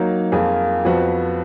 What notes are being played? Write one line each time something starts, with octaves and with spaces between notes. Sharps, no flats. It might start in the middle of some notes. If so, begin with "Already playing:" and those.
Already playing: F#3 A#3 D#4
F2 F3 A#3 F4 G#4
F2 F3 B3 F#4